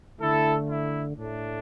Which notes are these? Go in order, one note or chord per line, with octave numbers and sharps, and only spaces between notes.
D3 A3 E4 A4
E4
A2 A3 D4